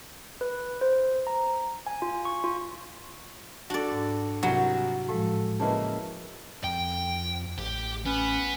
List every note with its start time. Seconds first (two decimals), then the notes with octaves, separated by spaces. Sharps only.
0.41 B4
0.81 C5
1.27 A#5
1.86 G#5
2.02 F4
2.25 C#6
2.44 F4
3.70 D4 F#4 A4 D5
3.92 G#2
4.43 C2 F#3 G3
5.09 A2 F3 G#3 A4
5.60 C#3 A#3 E4 B4 D#5 A5
6.64 F2 G5
7.58 A1 G4
8.06 B3 C#4